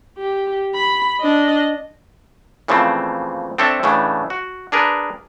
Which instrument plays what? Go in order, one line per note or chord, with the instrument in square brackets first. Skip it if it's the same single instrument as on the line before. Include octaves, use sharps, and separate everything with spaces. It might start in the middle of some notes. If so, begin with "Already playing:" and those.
[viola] G4
B5
D4 D#5
[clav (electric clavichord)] A#2 C#3 E3 F3 A3 C4
C4 D4 A4 C#5 E5
A2 C#3 E3 A3 D4
F#4
D4 G#4 A#4 B4